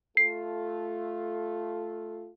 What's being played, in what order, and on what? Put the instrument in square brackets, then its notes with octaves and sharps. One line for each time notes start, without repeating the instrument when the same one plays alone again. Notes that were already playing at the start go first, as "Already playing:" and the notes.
[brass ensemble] A3 F4 A4 [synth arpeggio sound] C7